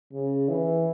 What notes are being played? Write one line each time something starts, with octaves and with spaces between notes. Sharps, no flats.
C#3
E3